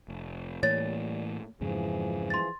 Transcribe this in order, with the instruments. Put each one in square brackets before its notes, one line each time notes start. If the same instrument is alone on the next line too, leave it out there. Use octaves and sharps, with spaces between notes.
[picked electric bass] F1
[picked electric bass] A2 E3 A#3 [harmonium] G3 [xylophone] C#5 A6
[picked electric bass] F2 G#2 C#3 [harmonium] E3 F3 G#4
[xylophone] C6 A6